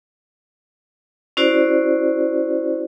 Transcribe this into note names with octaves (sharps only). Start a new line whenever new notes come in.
C#4 E4 F#4 C5 D5